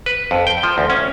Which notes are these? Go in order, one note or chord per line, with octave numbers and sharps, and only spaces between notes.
B4
F2
G5
F3
D2
C#4